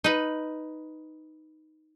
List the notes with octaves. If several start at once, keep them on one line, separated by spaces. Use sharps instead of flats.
D#4 B4